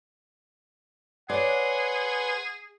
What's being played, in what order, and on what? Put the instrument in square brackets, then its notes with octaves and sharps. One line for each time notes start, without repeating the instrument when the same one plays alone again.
[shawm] G#4 [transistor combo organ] B4 G#5 C6 [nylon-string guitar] C#5 D5 [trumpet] F#5